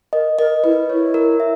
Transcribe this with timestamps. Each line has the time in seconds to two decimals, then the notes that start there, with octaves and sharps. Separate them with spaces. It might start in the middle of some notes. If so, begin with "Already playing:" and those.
0.13 A#4 D#5
0.38 A#4 D#5
0.64 E4 B4
0.89 E4 C#5
1.14 A#4
1.40 E5